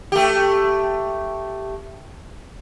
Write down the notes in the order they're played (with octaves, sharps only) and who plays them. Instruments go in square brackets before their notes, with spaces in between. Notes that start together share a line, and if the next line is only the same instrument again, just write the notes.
[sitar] A3 G4